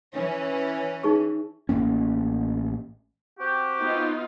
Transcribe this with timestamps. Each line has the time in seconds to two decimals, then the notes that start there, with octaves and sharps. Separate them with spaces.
0.14 E3 C#4
1.03 D#4 G#4 C#6
1.69 A1 D3 A#3 C#4
3.39 C4 F#4 G4
3.80 B3 D#4 F4